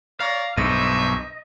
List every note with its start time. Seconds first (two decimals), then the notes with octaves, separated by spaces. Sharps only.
0.20 C#5 D5 F5 A#5
0.57 B1 G2 C5 C#5 D#5 E5